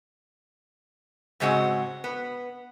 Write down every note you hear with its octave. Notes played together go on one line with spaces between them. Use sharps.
G#2 C#3 G#3 C4 F#4
B3